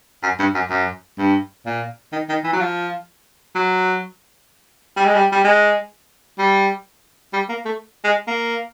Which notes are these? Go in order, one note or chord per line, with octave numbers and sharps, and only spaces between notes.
F#2
G2
F#2
F#2
G2
A#2
D#3
D#3
E3
F#3
F3
F#3
G3
G#3
G3
G3
G#3
G3
G3
A#3
A3
G#3
A#3